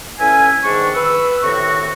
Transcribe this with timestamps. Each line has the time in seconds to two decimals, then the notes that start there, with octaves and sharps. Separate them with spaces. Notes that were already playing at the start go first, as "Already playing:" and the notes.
0.19 A2 E3 C#4 E5 G#5
0.64 E2 G#2 D#3 D4 C#6
0.95 B4 E6
1.43 A2 C3 D#3 C4 F#4 C#6